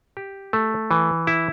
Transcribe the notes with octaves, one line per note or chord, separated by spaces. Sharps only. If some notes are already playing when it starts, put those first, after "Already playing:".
G4
A3
E3
E4